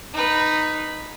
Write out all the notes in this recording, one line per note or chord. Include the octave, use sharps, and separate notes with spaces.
D#4 B4